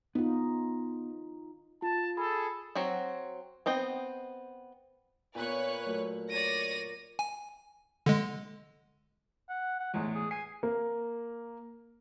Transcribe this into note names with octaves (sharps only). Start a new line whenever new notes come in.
B3 D#4 F4
F4 A5
G#4 A4 B5
F#3 C4 F#4
B3 C4 D#5 G5
A#2 A#3 B3 F4 B4 C#5 F#6
F#3 A3 A#3
C#5 D5 A#6 D#7
G#5
D3 G#3
F#5
F#5
E2 A2 G#3
G#4
G#5 C7
A#3